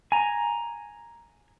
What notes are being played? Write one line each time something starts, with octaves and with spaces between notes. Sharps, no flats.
G#5 A#5